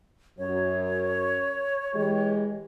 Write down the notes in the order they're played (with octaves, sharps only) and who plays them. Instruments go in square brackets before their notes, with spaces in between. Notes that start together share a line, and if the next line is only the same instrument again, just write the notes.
[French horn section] F#2 [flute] C#5
[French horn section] E3 G#3 G4